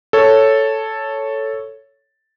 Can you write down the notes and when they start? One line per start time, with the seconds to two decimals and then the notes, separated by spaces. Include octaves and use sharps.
0.13 A4 C#5